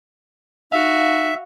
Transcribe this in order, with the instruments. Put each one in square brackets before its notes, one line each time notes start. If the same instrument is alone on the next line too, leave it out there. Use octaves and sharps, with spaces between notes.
[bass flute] D#4 [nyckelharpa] F#4 [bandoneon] E5 [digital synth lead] F5